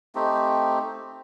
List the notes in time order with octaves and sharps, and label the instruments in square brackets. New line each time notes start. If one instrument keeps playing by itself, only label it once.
[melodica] A3 C4 D#4 G4